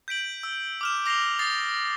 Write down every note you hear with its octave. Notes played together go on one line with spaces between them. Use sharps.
G6 B6 D7 F#7
E6
D6 F6 E7
D6 A#6 C7 F7 G7
D#6 A6 C7